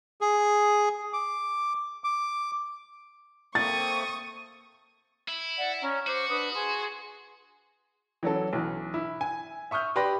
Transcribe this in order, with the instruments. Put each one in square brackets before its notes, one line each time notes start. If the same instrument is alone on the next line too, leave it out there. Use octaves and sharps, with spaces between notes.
[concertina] G#4
D6
D6
[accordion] A3 A#3 C4 [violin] C#6 D#6 [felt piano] A6
[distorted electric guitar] E4
[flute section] D5 F#5
C#4 A#5
[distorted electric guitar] F#4 [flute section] C5 D6
[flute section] D4 B4 D#6
G#4 G#5 C6
[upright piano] E3 F#3 C#4 A4
B1 E3
E4
G#5
E5 C#6 D#6 F6 G6
G4 B4 D5 C6 A#6